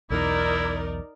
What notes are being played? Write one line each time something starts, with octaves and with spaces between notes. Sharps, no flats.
B1 E2 B2 D#4 E4 A#4 D5